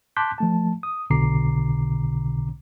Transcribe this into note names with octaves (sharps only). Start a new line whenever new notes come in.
A5 C6 D6 F#6 G6 B6
F3 A3 A5
D#6
B1 B2 D3 A#5 D6 C7